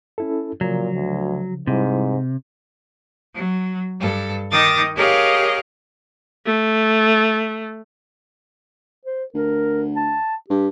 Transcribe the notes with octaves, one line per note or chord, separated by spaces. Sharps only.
C#4 E4 A4
A#2 C#3 F3 F#3
D2
G#2 C3 G3 E4
F#3
G2 A4
D#3 D#4 D6 D#6 A6 A#6
G4 G#4 A#4 C#5 D#5 F5
A3
C5
D2 A#4
A5
G2 G4